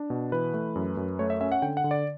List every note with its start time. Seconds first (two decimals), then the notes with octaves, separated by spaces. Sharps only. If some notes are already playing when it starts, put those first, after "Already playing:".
Already playing: D4
0.10 B2
0.32 E3 B4
0.54 A3
0.76 F#2
0.97 F#2
1.19 A3 C#5
1.30 E5
1.41 C#4 E5
1.52 F#5
1.62 D3 G5
1.77 F#5
1.84 D3
1.91 D5